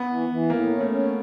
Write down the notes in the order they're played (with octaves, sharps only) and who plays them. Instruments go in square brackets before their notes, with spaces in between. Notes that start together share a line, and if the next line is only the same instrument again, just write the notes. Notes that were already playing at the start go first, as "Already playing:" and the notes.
Already playing: [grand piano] B3
[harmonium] E3
E3
[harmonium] A2 [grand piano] A#3
[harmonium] C#4
[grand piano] A3
[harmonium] C#4